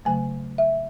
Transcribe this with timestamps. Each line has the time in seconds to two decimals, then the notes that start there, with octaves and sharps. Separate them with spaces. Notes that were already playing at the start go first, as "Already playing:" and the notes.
0.05 C#3 F#3 A3 G#5
0.58 E5